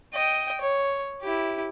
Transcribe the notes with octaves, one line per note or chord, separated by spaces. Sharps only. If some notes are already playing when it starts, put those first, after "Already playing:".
D#5 G5
C#5
E4 G4